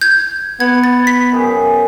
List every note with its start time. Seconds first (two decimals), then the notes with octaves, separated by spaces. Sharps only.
0.01 G6 G#6
0.60 B3 G#6
0.84 A6
1.07 B6
1.32 F#2 G#4 G5